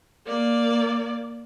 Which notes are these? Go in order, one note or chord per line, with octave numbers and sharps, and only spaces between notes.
A#3 D5